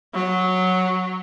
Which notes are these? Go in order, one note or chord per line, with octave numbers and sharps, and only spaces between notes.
F#3